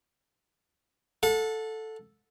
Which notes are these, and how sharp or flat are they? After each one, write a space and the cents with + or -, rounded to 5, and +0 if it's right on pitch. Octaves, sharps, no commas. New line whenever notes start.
A4 +0 F#5 -35